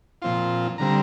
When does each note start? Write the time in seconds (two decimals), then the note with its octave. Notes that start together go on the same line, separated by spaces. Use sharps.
0.22 A#2 F3 C4 F4 C6
0.78 D3 G3 C4 A#5